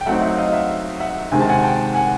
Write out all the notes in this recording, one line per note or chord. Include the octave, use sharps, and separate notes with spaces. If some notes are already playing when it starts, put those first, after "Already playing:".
G5
F#3 A3 C4 D#4 E5 F#5
E5 F#5
D#5 F5
E5 F#5
E5 F#5
C3 D#3 G#3 C4 G#5
A5
F#5 G#5
G5 A5
F#5 G#5